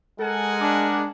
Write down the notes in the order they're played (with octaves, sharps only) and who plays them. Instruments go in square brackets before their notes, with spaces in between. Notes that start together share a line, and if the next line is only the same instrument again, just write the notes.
[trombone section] G#3 [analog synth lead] A4 [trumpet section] A#4 F#5 G#5
[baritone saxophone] D4 [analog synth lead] D6